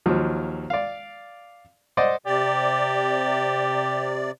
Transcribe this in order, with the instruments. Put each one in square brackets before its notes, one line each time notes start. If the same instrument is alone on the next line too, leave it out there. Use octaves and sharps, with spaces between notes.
[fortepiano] D#2 F3 F#3
D5 F5
C5 D5 D#5 F#5
[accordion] C3 D5 [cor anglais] G4